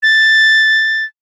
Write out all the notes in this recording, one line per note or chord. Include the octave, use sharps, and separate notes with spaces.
A6